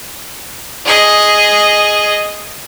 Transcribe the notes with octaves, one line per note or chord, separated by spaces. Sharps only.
G#4 D#5